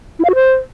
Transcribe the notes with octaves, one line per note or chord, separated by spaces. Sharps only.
E4
F5
F#4
C5